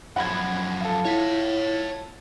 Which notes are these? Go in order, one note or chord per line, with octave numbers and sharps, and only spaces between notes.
F#2 F3 F#5 B5 G#6
F4 A4
E4 C#5 E5